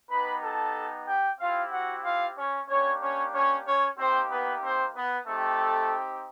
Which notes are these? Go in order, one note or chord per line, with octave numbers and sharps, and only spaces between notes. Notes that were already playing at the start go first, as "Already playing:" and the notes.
B3 D#4 G4 B4 B5
A4 A5
G4 G5
C4 E4 F4 G4 F5
F#4 F#5
F4 F5
C#4 C#5
A#3 C#4 D4 G4 C#5
C#4 C#5
C#4 C#5
C#4 C#5
A#3 C4 D#4 G4 C5
B3 B4
C4 C5
B3 B4
A3 C4 D#4 G4 A4